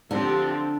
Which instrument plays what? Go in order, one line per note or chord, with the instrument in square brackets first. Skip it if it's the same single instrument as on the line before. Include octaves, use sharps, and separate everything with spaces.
[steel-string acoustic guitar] D3 D4 [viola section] F3 C4 G4